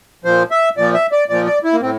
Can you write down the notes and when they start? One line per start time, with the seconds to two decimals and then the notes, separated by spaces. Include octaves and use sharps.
0.25 A#2 F3 C5
0.51 E5
0.77 A#2 F3 D5
0.94 E5
1.12 D5
1.29 A#2 F3 D5
1.46 D5
1.64 E4
1.73 A#3
1.81 A2 C4